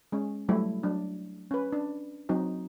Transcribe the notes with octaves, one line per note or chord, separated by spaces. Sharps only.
G#3 C#4
F#3 G3 A3 E4
F#3 D4
C#4 B4
D4
F#3 C4 D#4 F#4